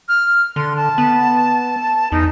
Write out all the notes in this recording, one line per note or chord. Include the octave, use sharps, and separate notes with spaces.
F6
D3 C6
A5
B3
E2 D#4